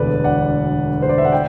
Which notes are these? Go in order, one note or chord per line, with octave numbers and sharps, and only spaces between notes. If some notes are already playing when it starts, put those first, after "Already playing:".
Already playing: E1 D2 D3 B4 D5
D5 F#5
C5
D5
E5
F#5
G5